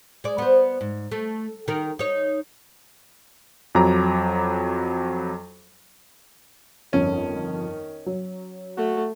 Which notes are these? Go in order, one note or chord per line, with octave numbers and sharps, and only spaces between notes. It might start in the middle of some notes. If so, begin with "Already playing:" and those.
G#3 D5
B3 C5
G#2
A3
D#3 A#4
D#4 C#5
F2 F#3 A#5 D6
G1 F2 D#3 C#4
F#3
A3 F#4